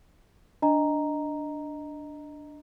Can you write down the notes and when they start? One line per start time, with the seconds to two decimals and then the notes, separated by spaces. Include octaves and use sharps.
0.62 D4 D#5 A#5